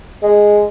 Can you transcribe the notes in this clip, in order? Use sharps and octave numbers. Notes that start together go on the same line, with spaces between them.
G#3